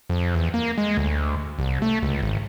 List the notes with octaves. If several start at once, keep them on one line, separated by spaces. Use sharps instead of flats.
F2
E2
A#3
G#3
D2
C2
A3
C#2
G#1